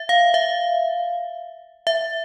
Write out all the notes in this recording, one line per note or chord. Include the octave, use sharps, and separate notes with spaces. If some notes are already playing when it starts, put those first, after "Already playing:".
Already playing: E5
F5
E5
E5